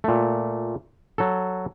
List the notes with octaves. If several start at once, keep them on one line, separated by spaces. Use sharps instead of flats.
A#2 A3
F#3 A4